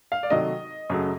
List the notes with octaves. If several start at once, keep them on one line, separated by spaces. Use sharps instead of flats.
F5
D5
C3 D#3 F#3 A3 D#5
F#2 C#3 F#3 A3